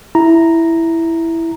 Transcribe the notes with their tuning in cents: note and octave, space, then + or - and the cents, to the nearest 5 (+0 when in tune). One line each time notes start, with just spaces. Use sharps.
E4 +0 A#5 +0